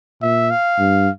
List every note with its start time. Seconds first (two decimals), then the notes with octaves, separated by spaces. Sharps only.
0.22 A#2 E5
0.50 F5
0.79 G2